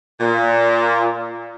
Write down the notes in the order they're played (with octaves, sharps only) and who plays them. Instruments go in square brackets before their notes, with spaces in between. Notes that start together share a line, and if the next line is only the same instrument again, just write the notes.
[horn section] A#2